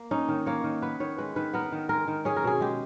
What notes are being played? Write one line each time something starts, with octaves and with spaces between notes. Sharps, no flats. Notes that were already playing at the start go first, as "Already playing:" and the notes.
Already playing: A#3
C#4 D#4
D#3
A#3 C#5
D#3
B3 B4
D#3 C#5
G#3 B4
D#3 B4
B3 A#4
D#3
G#3 A#4
D#3
C#4 G#4
A#4
B2 G#4
G#3 G4